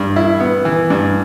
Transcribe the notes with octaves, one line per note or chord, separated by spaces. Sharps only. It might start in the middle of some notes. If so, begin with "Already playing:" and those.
Already playing: G2
E4
B3
E3
G2